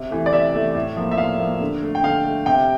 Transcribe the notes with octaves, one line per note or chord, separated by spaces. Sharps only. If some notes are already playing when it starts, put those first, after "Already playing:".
Already playing: C3
E3 A3
D5
C3 E5
E3 A3
A2
F3 A#3
E5
A2 F5
F3 A#3
D3
A3
G5
D3 F5
A3
C3 G5